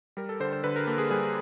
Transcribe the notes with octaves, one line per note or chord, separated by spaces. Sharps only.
G3 A#4
A4
D3 C5
C5
D3 B4
A#4
A#3 A4
G#4
G3 G#4